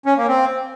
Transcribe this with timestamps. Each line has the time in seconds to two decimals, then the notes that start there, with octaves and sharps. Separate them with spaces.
0.06 C#4
0.17 A#3
0.28 C4